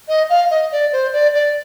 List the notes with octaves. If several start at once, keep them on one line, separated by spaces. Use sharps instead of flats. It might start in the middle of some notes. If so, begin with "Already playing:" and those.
D#5
F5
D#5
D5
C5
D5
D5